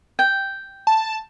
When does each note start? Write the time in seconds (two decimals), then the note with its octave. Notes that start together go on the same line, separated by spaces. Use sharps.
0.19 G5
0.87 A5